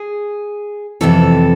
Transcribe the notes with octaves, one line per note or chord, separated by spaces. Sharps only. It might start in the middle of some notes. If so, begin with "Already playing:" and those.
Already playing: G#4
F2 C3 E3 A4